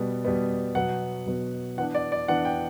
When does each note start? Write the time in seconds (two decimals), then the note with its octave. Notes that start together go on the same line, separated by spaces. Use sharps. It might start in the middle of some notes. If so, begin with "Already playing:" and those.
Already playing: B2 G3 B3
0.25 B2 G3 B3
0.75 B2 F#3 B3 F#5
1.26 B2 F#3 B3
1.77 E3 B3 D4 F#5
1.95 D5
2.12 D5
2.28 E3 B3 D4 F#5
2.45 G5